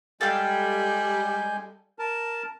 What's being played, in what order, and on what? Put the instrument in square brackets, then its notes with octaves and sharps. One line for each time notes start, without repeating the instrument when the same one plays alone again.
[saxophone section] G3 [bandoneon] G#3 G#5 G6 [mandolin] A4 F5 G5
[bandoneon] A#4 A5